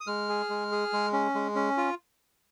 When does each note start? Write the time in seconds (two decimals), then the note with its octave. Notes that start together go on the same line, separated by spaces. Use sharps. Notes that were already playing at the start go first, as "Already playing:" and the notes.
0.01 D#6
0.07 G#3 F6
0.29 G#4
0.50 G#3
0.72 G#4
0.93 G#3
1.13 C#4
1.35 G#3
1.55 C#4
1.77 F4